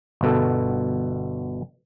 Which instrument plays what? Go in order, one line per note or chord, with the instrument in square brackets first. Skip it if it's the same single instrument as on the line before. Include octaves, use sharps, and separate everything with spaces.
[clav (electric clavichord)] G1 B2 A4